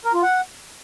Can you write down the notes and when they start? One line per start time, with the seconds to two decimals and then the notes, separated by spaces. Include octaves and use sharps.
0.05 A#4
0.14 F4
0.22 F#5